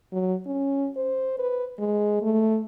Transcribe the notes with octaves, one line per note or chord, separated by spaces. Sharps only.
F#3
C#4
C5
B4
G#3
A3